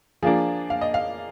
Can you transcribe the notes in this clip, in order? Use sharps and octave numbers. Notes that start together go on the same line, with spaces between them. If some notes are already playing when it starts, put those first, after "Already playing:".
F3 A#3 D4 G#4
F5
D#5
F5